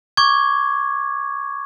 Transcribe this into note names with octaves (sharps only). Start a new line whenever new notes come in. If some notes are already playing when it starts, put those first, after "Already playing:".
C#6 D6 G#6